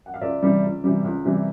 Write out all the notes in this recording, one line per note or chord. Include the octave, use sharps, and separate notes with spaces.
F#5
F5
C#2 D5 E5
C3 E3 G3
C#2
C3 E3 G3
C#2
C3 E3 G3